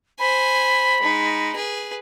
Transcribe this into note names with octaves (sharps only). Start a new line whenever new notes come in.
C5 G#5 B5
G#3 D#4
G#4 B4